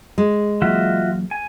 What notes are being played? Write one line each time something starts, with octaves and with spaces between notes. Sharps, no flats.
G#3
E3 F#3 A#3 F4 F#4 E5
G#5